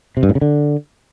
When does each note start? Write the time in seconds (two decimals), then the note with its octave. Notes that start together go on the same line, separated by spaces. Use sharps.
0.17 C3
0.23 G2
0.29 A2
0.35 C#3
0.41 D3